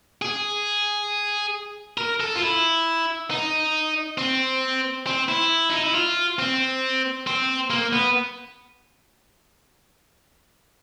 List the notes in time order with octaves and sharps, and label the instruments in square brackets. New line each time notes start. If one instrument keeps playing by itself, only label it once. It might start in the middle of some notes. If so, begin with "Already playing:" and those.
[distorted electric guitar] G#4
A#4
A4
F4
E4
D#4
C4
C4
E4
D#4
E4
F4
C4
C4
A#3
B3